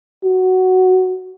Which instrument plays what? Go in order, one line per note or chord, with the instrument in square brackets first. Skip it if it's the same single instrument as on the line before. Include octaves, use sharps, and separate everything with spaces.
[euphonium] F#4